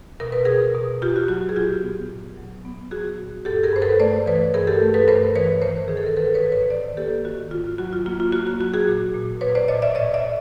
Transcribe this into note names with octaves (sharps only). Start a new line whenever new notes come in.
B2 A#4
B4
B2 G#4 A#4
B2
B2 F4 G4
F#4
F#3 F#4
G#4
A#2 F4 G4
B3
A#2
F#3
B3
F#3 F#4 G#4
A#2
G2 G4 A4
G#4 A#4
G2 C5
A4 B4
A3 C5 D5
E3 B4 C#5
G2 G#4 A#4
G4 A4
A3
A4 B4
G2 A#4 C5
E3 B4 C#5
D#3 A#4 C5
D#3 G#4
A4
A#4
D#3 A4 B4
B4 C#5
G#2
B4 C#5
D#3 C5 D5
A#3 G4 A4
D#3 F#4
G#2 F4
F#3 F#4
F4
A#3 F4
F4
A#3 F#4
F#4
F#3 F#4
F#4 G#4
A#2
A#2
A#2 B4 C#5
C5 D5
A#2 C#5 D#5
D5 E5
A2 C#5 D#5
D5 E5
A2